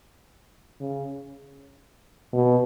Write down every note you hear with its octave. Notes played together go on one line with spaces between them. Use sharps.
C#3
B2